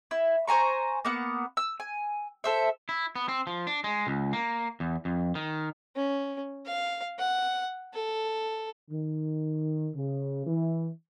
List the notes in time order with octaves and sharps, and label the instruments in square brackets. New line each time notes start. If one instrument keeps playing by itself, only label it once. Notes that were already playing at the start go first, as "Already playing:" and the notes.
[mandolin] E4
C5 G#5 A#5 C#6
A#3 B3 F#5
E6
G#5
A4 C5 E5
[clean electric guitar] E4
B3
C4
F3
D4
G#3
C#2
A#3
E2
F2
D#3
[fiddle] C#4
F5
F#5
A4
[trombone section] D#3
C#3
E3